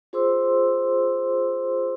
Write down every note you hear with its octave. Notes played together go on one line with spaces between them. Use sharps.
F4 G#4 C5 C6 D6 E6